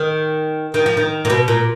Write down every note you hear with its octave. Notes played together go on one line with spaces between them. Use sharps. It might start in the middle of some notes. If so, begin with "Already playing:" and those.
Already playing: D#3
D#3
F3
D#3
A#2
B2
A#2